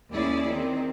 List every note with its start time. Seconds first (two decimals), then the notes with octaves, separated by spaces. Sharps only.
0.12 D#2 C#4 E4 G#4 D5
0.46 D#3 C4